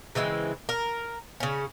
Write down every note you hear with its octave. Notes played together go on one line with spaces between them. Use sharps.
C#3 E3 G#3 C4
A#4
C#3 C#4